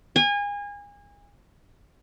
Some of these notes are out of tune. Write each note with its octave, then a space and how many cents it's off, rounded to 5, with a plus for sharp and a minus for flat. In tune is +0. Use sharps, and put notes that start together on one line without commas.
G#5 -30